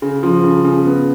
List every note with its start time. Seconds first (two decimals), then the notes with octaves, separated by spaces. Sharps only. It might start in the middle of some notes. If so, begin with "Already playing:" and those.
0.02 C#3
0.23 F3
0.43 C#3
0.64 C#3
0.85 B3